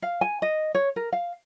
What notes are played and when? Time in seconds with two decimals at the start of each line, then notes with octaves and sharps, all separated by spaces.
0.02 F5
0.21 G#5
0.42 D#5
0.75 C#5
0.96 A#4
1.12 F5